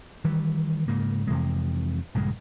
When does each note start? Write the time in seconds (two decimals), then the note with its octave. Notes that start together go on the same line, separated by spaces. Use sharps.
0.24 D#3 E3 G3
0.88 G#2 C#3 A#3
1.27 F2 C3 E3 G#3
2.15 A#1 G2 C#3 G#3